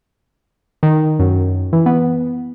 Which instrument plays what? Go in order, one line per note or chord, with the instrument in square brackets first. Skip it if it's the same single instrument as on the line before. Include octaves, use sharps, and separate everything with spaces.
[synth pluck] D#3
F#2
E3
B3